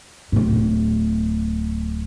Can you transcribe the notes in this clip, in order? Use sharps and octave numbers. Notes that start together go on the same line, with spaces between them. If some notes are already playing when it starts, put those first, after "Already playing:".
D1 A2